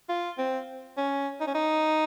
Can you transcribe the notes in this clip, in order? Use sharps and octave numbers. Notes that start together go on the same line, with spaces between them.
F4
C4
C#4
D#4
C#4
D#4